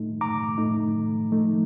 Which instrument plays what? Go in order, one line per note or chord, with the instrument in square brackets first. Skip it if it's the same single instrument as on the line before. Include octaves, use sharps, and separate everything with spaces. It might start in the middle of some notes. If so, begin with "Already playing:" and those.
Already playing: [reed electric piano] A2 A3 D#4
A#5 D6
A2 A3 D#4
F3 A3 D#4